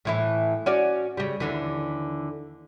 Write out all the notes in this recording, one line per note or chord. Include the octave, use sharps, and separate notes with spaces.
A2 E3 E4
C#4 F#4 D5
C#3 G3
D#2 D3 E3